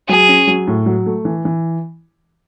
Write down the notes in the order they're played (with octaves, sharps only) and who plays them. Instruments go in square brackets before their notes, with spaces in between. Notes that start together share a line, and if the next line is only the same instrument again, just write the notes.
[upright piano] F#3 [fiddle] G#4
[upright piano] C#4
F#3
A2
F#3
A3
E3
E3